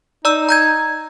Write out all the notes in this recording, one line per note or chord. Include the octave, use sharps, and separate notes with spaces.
D#4 D5 A#5 E6
A#5 G6 G#6